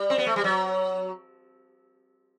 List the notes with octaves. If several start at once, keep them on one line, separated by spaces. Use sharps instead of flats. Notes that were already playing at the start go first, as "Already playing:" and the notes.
Already playing: G3
C4
B3
A3
G3
F#3